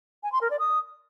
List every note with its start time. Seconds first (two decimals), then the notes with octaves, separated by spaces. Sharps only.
0.23 G#5
0.32 C6
0.41 A#4
0.50 D5
0.59 D#6